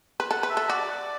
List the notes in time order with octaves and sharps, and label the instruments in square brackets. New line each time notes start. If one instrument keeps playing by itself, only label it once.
[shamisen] B4
[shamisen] A4 [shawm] F#5
[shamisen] B4
[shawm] E5
[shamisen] A4
[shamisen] F#4 [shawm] D5